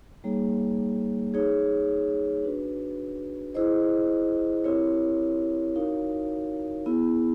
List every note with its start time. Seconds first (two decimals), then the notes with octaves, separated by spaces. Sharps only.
0.24 G3 A#3 D#4 G#4 C#5
1.34 D#4 G#4 C#5
2.44 D4 F#4 B4
3.55 E4 G#4 C5 D#5
4.64 C4 E4 G4 A#4 C#5
5.76 D#4 F#4 A#4 C#5 F5
6.86 B3 E4 G#4